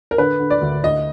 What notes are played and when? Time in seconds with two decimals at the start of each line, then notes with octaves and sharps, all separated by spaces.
0.11 A#4
0.18 D3 B4
0.39 D3
0.50 D5
0.61 D2
0.84 D2 D#5